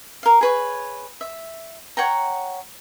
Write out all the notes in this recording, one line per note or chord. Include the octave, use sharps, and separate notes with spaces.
A#4 F5
G#4 B4 C#5
E5
C#5 F#5 G5 A#5